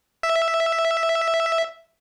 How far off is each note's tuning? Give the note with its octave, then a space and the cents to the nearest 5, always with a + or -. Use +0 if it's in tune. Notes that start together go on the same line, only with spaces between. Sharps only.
E5 +0